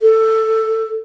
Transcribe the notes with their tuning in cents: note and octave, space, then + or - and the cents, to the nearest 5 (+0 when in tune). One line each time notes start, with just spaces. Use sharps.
A4 +10